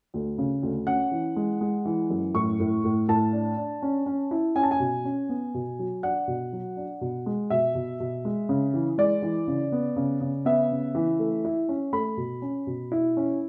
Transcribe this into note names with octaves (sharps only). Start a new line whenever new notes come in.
D2
C#3
D2
C#4 F#5
E3
G#3
G#3
E3
F#2
A2 C#6
A2
A2
A2 A5
D4
D4
C#4
C#4
E4
C#4 G#5
A5
G#5
B2
C#4
B3
B2
F#3
D4 F#5
B2
F#3
D4
B2
G#3
B2 E5
B2
B2
G#3
C#3
E3
G#3 D5
E3
C#3
B3
C#3
C#3
B3 E5
C#3
E3
A3
E4
C#4
A3 B5
B2
C#4
B2
E4
C#4